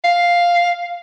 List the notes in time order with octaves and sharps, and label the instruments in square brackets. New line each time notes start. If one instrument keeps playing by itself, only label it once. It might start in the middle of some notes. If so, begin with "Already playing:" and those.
[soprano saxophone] F5